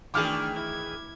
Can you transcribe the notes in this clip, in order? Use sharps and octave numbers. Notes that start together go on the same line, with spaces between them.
D2 D#3 E3 D4 G#4 G5 D6 F6
E4 G#6